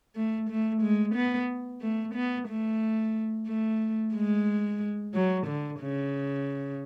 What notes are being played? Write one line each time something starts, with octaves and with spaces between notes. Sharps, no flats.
A3
A3
G#3
B3
A3
B3
A3
A3
G#3
F#3
D3
C#3